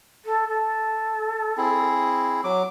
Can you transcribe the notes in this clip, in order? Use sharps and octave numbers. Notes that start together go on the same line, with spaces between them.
A4
A4
C4 E4 G#4
F#3 D6